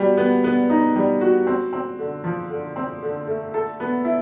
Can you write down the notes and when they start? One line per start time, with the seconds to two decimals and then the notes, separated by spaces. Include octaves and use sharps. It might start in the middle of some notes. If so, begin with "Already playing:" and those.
Already playing: G3 B3 F#4
0.17 B3
0.44 B3
0.69 D#4
0.96 G3
1.21 F#4
1.47 C4
1.73 C4
1.99 D3
2.24 F3
2.50 D3
2.76 C4
3.02 D3
3.27 A3
3.54 A4
3.80 B3
4.05 E4